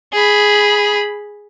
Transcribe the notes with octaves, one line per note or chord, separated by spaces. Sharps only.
G#4 B5